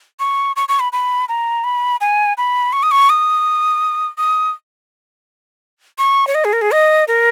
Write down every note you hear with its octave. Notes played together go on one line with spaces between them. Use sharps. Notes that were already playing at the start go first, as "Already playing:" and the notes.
C#6
C#6
C#6
B5
B5
A#5
B5
G#5
B5
C#6
D#6
C#6
D#6
D#6
C#6
C#5
D#5
G#4
A#4
G#4
D#5
A#4